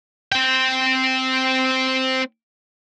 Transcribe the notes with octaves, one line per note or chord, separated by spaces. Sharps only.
C4 G5